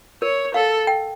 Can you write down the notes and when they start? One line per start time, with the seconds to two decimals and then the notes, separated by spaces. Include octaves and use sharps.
0.22 A#4 C#5
0.54 A4 F5
0.87 G5